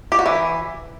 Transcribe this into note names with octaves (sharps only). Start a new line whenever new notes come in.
G4
F#4
E3